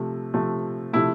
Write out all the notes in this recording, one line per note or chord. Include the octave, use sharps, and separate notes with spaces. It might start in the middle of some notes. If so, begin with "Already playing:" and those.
Already playing: C3 F3 A3
C3 F3 A3
C3 F3 A3 E4